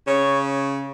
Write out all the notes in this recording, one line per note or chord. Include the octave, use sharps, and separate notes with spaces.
C#3 C#5